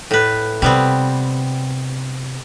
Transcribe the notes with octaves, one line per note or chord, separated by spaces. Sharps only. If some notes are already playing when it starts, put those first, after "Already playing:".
A2 B4
C3 G3 B3 C4